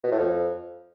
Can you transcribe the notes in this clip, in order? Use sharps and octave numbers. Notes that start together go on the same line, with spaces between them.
B2
A2
F2